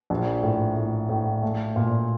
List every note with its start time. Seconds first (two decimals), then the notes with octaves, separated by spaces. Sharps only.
0.10 A#1
0.43 A2
0.76 A2
1.09 A2
1.42 A3
1.76 A#2